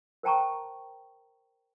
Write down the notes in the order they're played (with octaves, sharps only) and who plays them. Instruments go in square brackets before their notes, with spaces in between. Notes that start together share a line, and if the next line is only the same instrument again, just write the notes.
[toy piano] A#4 C5 G5 A5 A#5 C#6